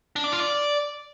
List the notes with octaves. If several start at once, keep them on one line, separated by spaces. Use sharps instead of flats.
D4
D5
F4
D5